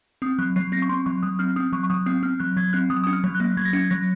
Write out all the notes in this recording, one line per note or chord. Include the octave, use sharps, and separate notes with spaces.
C4 D#6
F#3 F#6
F#3 C7
C4 A#6
C#6
C4 C6
F#3 C#6
F#3 D#6
C4 F6
C4 D#6
F#3 C#6
C#6
F#3 D#6
C4 D#6
C4 F6
F#3 F#6
F#3 G#6
C4 F#6
F#3 D#6
C#4 D#6
F6
F#3
F#6
A#3
F#3 G#6
A#6
C#4 G#6
F#3 A#6